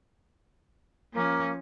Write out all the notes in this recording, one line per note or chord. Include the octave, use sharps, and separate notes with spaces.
F3 A#3 C#4